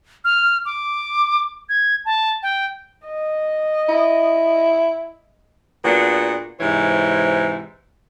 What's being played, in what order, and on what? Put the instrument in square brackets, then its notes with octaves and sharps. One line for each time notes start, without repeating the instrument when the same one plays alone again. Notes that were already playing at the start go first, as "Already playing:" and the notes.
[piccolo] F6
D6
G#6
A5
G5
[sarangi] D#5
[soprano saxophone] E4
[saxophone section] A#2 B3 D4 F#4 G#4
G#2 C3 E3 C5 C#5